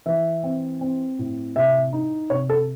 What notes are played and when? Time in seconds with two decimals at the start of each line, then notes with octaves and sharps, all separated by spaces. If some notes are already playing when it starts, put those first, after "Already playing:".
0.06 E3 E5
0.44 C4
0.81 C4
1.19 A2
1.56 C3 E5
1.93 D#4
2.30 C3 C#5
2.50 A4